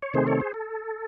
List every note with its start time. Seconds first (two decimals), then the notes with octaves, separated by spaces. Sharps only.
0.02 C#5
0.14 C3 D#3 A3 C4 G#4 C5
0.27 A4 C#5
0.40 G#4 C5
0.54 A4